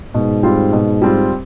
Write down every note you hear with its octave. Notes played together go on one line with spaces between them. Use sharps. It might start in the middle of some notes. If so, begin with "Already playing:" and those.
G#2 B2
G3 C4 F4
B2
G3 C4 F4